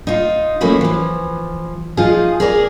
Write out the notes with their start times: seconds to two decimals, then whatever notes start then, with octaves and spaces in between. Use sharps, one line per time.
0.07 D#4 F4
0.61 F3 F#3 A3 A#3 C#4 E4
0.81 E3 F3
1.97 F3 D#4 F4 G#4 D#5
2.40 G#4 A#4 C#5 D5